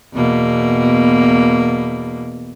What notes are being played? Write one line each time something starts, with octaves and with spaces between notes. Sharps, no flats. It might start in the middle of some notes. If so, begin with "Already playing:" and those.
E2 B2 A#3